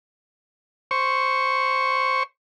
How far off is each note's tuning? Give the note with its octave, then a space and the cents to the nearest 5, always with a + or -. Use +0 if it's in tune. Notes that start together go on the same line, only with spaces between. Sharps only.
C5 +0 C#6 +0